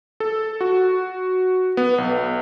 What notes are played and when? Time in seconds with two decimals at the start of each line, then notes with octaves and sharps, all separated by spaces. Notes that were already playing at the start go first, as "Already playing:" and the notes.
0.20 A4
0.61 F#4
1.77 B3
1.98 B1